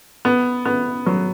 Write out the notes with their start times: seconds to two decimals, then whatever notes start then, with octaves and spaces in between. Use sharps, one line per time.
0.25 B3
0.65 B3
1.06 F#3